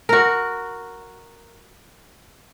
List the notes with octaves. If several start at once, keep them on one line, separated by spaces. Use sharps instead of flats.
F#4 A#4